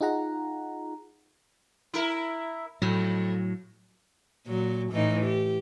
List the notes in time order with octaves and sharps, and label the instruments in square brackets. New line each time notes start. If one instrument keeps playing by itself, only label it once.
[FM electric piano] D#4 F4 G#4 F#5 A#5
[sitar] E4 A#4
[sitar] F2 [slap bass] A2 F#3
[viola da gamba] A#2 F#3
A2 E3 D#4
G4